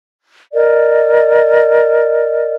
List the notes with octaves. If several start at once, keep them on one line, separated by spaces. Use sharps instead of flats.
A#4 D5 D#5